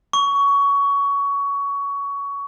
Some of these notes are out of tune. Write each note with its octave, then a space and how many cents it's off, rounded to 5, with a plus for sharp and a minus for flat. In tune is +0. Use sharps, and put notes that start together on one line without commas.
C#6 +20